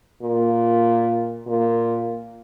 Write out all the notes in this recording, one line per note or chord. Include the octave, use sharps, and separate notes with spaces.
A#2
A#2